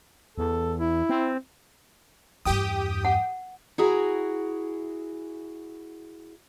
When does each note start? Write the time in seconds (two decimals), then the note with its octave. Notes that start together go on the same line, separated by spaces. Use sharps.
0.38 E2 A4
0.80 E4
1.09 C4
2.45 E2 G2 G4 G5 D#6
3.05 F#5
3.78 E4 F#4 G#4 G#5 A#5